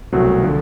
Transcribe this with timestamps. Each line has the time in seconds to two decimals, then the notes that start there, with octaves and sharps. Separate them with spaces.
0.13 C2 B2 F#3 A3 C4
0.42 D3 F3